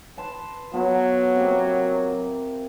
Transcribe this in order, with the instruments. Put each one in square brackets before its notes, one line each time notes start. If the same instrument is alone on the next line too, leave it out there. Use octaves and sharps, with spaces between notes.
[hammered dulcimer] B4 A5 C6
[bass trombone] F#3 [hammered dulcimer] B3 F4
[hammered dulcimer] C3 A#3